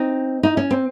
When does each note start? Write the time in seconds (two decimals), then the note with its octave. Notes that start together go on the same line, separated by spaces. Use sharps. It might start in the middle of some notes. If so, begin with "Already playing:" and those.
Already playing: C4 D#4
0.43 D#4
0.57 C#4
0.71 C4